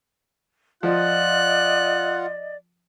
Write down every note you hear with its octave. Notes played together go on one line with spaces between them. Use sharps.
F3 F4 D5 D#5 F#5 F#6